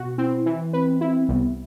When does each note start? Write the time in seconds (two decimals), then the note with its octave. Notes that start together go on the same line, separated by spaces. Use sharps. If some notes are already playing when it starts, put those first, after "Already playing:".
Already playing: B2 F#4
0.18 C4 E4
0.46 E3
0.73 C4 B4
1.00 C4 E4
1.28 C2 B3